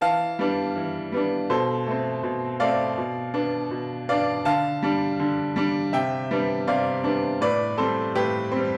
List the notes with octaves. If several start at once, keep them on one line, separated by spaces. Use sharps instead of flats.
E3 F5 A5
G3 B3 D4
E3
G3 B3 D4
B2 A4 C5
A3 C4
B2
A3 C4 D5 F5
B2
B3 D4
B2
B3 D4 D5 F5
D3 F5 A5
G3 D4
D3
G3 D4
C3 E5 G5
G3 B3 D4
C3 D5 F5
G3 B3 D4
A2 B4 D5
G3 C4 A4 C5
A2 G4 B4
G3 C4